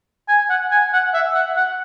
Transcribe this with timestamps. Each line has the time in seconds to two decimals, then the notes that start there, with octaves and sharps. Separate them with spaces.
0.28 G#5
0.50 F#5
0.71 G#5
0.93 F#5
1.13 E5
1.34 F#5
1.57 F#5